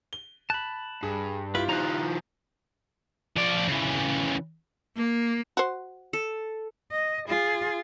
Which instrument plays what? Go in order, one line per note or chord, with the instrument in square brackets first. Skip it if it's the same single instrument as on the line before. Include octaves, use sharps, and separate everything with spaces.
[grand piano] G7
[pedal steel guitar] A5 B5 [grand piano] F#6
[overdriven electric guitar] G2 [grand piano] G#4
[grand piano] E4 F4 G4 [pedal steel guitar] B4
[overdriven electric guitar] D#3 F3 [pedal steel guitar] A#5 F#6
[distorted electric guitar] F3 D5
C#3 E3
[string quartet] A#3
[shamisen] F#4 C5
[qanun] A4
[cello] D#5
F4 G#4